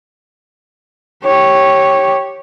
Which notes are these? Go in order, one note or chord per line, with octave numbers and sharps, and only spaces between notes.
G4 C#5